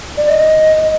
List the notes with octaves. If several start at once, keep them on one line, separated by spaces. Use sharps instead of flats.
D5
D#5